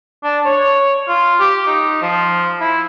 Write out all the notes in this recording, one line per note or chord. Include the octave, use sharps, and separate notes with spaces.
D4
C#5
F4
G4
D#4
F3
E4